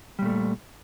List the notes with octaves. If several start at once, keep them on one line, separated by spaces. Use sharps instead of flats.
A#2 G3 A3